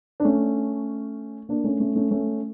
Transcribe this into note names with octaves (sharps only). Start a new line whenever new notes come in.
D4
A3 C#4
A#3 D4
A3 C#4
A3 C#4
A3 C#4
A3 C#4